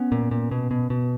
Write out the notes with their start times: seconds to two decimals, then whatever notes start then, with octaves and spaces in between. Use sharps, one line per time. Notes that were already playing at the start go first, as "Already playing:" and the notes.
Already playing: B3 C#4
0.12 A#2
0.31 A#2
0.51 B2
0.71 B2
0.90 B2